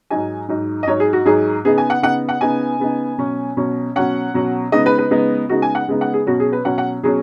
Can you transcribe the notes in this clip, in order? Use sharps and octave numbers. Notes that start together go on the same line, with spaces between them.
G#2 F#3 D#4 G#5
G#2 F#3 D#4
D#5
G#2 F#3 D#4 C#5
G#4
F#4
G#2 F#3 D#4 G#4
C#3 B3 D#4 G#4
G#5
F#5
C#3 B3 D#4 F#5
F#5
C#3 B3 D#4 G#5
C#3 B3 D#4
B2 F#3 C#4
B2 F#3 C#4
B2 F#3 C#4 F#5
B2 F#3 C#4
C#3 G#3 B3 D#4 D#5
B4
B4
C#3 G#3 B3 D#4
C#3 G#3 B3 D#4 F#4
G#5
F#5
C#3 G#3 B3 D#4
F#5
G#4
B2 F#3 C#4 F#4
G#4
B4
B2 F#3 C#4 F#5
F#5
B2 F#3 C#4 G#4